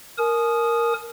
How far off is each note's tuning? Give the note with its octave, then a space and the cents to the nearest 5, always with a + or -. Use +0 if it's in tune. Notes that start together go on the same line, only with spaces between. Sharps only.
A#4 +0 G#5 +40 D#6 -10